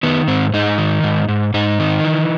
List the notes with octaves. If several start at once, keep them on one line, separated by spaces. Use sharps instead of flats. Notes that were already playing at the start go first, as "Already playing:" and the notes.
D#3 B3
G#2 C4
G#2 D#4
D#3
G#2
G#2
G#2 D#4
D#3
E3